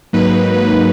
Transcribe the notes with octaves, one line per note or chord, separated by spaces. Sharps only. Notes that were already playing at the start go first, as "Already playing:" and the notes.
G#2 F#3 A#3 D#4 B4